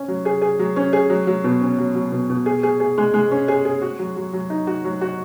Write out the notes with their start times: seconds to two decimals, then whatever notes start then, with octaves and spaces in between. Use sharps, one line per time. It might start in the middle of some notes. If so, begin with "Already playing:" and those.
Already playing: C#4
0.08 F#3
0.25 G#4
0.41 G#4
0.59 F#3
0.76 C#4
0.93 G#4
1.10 F#3
1.27 F#3
1.44 B2
1.61 C#4
1.78 F#3
1.95 F#3
2.12 B2
2.30 B2
2.46 G#4
2.63 G#4
2.80 G#4
2.98 G#3
3.14 G#3
3.31 C#4
3.48 G#4
3.65 G#4
3.82 F#4
3.99 F#3
4.16 F#3
4.33 F#3
4.50 D#4
4.67 F#4
4.84 F#3
5.01 F#4